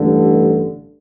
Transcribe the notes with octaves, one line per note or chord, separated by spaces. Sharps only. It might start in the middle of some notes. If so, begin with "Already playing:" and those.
Already playing: A1 G2 D3